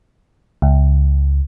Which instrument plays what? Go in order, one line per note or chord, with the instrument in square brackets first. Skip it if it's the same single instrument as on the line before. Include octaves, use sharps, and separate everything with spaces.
[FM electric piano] C#2